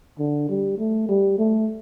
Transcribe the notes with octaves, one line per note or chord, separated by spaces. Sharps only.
D3
G3
A3
G3
A3